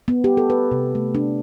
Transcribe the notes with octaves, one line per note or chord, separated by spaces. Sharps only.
B3
G4
A4
B4
C3
A3
D4